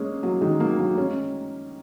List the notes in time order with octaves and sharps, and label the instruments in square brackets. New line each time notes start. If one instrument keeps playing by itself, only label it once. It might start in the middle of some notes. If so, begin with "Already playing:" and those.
Already playing: [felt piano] G#3 A#3 C#4
F#3 A#3
D#3 G#3
F#3 A#3
F#3 A#3
G#3 C#4